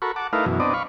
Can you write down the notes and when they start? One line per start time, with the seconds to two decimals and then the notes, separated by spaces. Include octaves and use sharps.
0.02 F#4 A4 A#4 B5 C#6
0.16 F#5 A5 D6
0.33 A3 D#4 E4 A#4 B4 F5
0.46 F#2 B2 E3
0.60 B3 C4 D4 D5 D#5
0.74 F5 B5 C#6